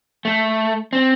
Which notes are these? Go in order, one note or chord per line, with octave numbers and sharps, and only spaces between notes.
A3
C4